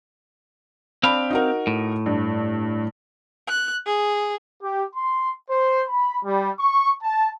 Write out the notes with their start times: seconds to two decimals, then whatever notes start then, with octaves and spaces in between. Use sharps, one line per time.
1.03 C4 D4 F5 B5 D7
1.30 D#4 F#4 A#4
1.67 A2
2.06 G2
3.48 F#6
3.86 G#4
4.61 G4
4.93 C6
5.49 C5
5.88 B5
6.23 G3
6.58 C#6
7.01 A5